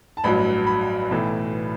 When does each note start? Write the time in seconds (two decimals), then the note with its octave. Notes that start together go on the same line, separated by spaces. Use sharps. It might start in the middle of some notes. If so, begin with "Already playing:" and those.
0.17 A5
0.24 A1 G2 F#3 B5
0.67 B5
1.11 B1 A2 E3